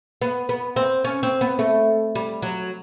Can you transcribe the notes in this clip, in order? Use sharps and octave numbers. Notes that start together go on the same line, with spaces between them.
B3
B3
C4
C#4
C4
B3
A3
G3
F#3